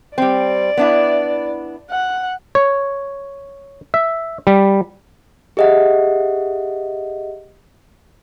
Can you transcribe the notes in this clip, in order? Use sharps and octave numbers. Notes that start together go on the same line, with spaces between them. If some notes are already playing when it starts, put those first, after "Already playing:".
G3 C4 D5
B3 D4 E4
F#5
C#5
E5
G3
G4 G#4 D#5 E5 F#5